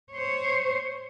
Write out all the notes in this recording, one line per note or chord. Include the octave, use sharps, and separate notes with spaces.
C5 C#5